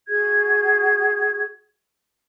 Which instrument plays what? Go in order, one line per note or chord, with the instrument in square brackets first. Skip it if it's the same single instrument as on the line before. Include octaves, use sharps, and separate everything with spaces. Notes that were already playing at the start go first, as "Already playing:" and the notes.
[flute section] F#4 G#4 G#6